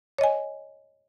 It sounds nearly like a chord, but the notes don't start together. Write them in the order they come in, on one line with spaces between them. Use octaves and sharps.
C#5 D#5 G#5